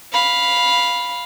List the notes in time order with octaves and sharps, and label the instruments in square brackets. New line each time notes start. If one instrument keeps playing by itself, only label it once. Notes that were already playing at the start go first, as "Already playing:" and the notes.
[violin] F5 B5